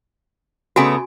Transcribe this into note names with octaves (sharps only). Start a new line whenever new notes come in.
C#3 A3 B3 F#4 G#5